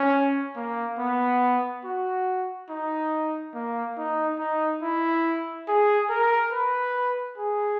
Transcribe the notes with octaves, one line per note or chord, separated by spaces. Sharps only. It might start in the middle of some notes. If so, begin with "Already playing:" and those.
Already playing: C#4
A#3
B3
F#4
D#4
A#3
D#4
D#4
E4
G#4
A#4
B4
G#4